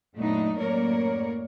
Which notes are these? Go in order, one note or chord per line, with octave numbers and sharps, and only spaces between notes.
F#2 A#2 A3 B3 D4 D#4
F#2 A2 A#3 A#4 C#5 D5